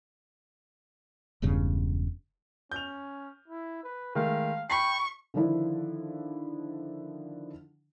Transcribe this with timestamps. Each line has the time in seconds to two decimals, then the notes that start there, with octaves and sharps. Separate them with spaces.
1.42 E1 E2 G2 C#3
2.72 C#4 G6 F7
3.48 E4
3.83 B4
4.15 D#3 G#3 A3 F5
4.70 G5 B5 C#6 B6 C7
5.34 D3 D#3 F3 D4 E4